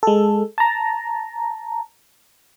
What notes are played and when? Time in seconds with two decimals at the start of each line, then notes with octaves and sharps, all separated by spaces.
0.03 G#3 A4
0.58 A5 A#5